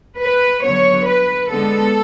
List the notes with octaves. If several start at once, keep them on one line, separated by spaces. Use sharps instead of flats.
B4
D3 F#3 B3 C#5
B4
D3 G#3 B3 A4